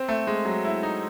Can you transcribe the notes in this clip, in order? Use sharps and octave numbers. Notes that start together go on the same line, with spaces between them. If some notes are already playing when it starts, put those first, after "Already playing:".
Already playing: C4
A3
G#3
F#3
E4
D#4